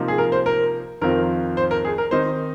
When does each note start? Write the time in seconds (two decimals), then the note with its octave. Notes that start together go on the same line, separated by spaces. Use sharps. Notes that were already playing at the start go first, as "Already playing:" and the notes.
Already playing: C3 F3 A#3 D#4
0.08 G#4
0.18 A#4
0.32 C5
0.46 A#4
1.01 F2 D#3 C4 F4 A#4
1.57 C5
1.71 A#4
1.85 G#4
1.98 A#4
2.11 D#3 C4 D#4 C5